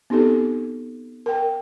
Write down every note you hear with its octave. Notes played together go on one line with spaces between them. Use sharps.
B3 C4 D#4 G4 A4
A#4 G5